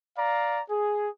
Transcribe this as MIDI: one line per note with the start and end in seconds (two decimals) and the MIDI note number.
0.17 0.61 74
0.17 0.61 77
0.17 0.61 82
0.70 1.08 68